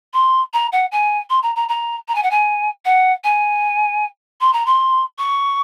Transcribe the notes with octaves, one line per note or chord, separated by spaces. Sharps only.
C6
A#5
F#5
G#5
C6
A#5
A#5
A#5
A#5
G#5
F#5
G#5
F#5
G#5
C6
A#5
C6
C#6